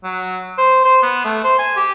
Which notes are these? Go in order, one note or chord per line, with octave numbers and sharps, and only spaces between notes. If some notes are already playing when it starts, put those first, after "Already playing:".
F#3
C5
C5
B3
A3
C5
G#5
G4